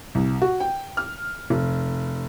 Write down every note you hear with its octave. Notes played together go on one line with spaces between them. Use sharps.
C2
F#4
G5
F6
F1